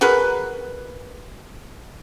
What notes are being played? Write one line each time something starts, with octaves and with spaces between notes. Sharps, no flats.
F#4 G#4 A#4 B4